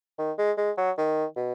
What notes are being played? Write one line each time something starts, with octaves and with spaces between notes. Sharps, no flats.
D#3
G#3
G#3
F#3
D#3
B2